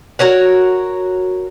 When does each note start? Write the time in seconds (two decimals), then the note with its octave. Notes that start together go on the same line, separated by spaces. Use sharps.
0.19 F#4 A#4 C#5 F#5